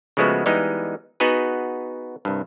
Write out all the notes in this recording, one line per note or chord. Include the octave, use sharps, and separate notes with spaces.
C#3 F3 G#3 A3 B3 F#4
E3 G3 G#3 B3 D#4
B3 D#4 F#4 G#4 B4
C2 G2